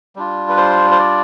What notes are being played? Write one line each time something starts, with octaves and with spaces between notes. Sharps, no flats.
G3 D4 F4
B4
C5
C5
D5